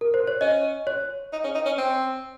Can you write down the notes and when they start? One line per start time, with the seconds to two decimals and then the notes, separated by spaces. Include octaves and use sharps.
0.01 A#4
0.14 C5
0.27 C#5
0.41 C#4 D#5
0.87 C#5
1.33 D#4
1.44 C#4
1.55 D#4
1.66 C#4
1.78 C4